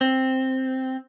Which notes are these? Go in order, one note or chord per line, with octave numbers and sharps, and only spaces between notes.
C4